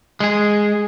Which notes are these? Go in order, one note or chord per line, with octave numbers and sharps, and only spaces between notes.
G#3 G#4